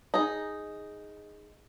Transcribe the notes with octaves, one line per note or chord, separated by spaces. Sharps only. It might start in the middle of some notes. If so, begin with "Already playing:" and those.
D#4 G#4